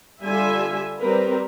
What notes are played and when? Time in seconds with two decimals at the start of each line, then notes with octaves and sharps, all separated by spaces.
0.23 D3 G3 F4 E5 G#5
1.01 G3 C4 A#4 B4